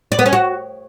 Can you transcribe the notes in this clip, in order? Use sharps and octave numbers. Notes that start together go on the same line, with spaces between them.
D5
B3
C#4
F#4